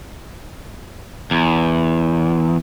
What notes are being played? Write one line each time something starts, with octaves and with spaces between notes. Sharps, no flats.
E2